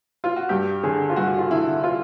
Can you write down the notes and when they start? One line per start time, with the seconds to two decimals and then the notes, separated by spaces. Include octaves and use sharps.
0.24 F4
0.36 F#4
0.49 G2 G4
0.83 D3 G#4
1.10 F4
1.16 G2 F#4
1.38 F4
1.51 D3 E4
1.83 F4